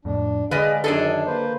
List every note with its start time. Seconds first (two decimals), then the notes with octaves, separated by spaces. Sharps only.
0.05 F2 A2 D4
0.51 D3 G#3 G#4 B4 D5 D#5 F5
0.84 F#2 D#3 D4 G#4 A4
1.27 A#3 B4 C5